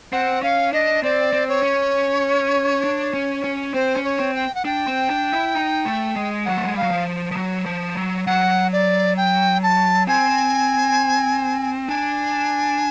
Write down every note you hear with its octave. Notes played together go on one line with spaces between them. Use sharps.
C4 F#5
C#4 F5
D4 D#5
C4 D5
C4
C#5
C#4
D4
C#4
C#4
C4 C5
C#4
C#5
C4
G5
F#5
D4 G5
C4
D4
E4
D#4
A3
G#3
F#3 F#5
A3
G#3
G3 F5
F#3
F3
F3
F#3
F3
F#3
F#3 F#5
D5
G5
A5
C4 G#5
D4 G#5